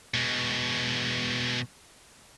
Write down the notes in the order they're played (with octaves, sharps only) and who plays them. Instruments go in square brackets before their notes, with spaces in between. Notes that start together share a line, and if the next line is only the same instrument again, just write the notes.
[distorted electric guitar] B2 G#3